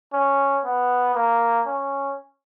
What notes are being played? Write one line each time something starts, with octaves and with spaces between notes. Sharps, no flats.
C#4
B3
A#3
C#4